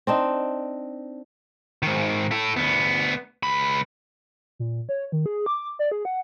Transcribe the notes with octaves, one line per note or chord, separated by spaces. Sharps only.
C4 D4 D#4
G#2 D#3
E4 A4
D2 B3
C#2 B5
A#2
C#5
D#3
G#4
D6
D5
G#4
F#5